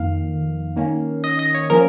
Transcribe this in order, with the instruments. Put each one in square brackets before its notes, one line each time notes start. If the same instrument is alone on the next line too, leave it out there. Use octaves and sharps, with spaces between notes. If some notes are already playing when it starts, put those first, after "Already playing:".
Already playing: [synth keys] F2 D#3 A#3 F5
D#3 A#3 C#4
D#5
D#5
C#5
F3 A#3 C#4 A#4